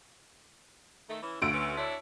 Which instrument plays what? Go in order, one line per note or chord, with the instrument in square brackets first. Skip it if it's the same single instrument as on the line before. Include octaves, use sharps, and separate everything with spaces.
[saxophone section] D#3 A3
E3 C#4 E4
[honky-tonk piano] D2 E6 D7 [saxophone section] D3 F3 F#4
[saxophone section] C#4 F#4 B4
D4 E4 C#5